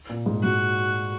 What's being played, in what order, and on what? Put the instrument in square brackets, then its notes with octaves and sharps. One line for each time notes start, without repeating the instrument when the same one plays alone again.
[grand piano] A#2
G#2
[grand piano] G#2 [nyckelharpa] F#4